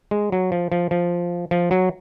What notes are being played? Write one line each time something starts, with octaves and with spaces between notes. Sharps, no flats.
G#3
F#3
F3
F3
F3
F3
F#3